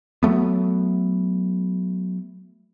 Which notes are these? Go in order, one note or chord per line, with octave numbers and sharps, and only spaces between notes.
F#3 A3 B3